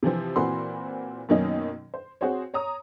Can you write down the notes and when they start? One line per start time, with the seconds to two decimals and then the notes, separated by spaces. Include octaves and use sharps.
0.03 C3 E3 F3 C4
0.36 A#2 E3 C4 F#4 B5 C6
1.29 F#2 B2 D#3 A#3 C#4 D#4
1.94 C5
2.21 C4 F#4 G#4 C5 C#5
2.54 C#5 A#5 D#6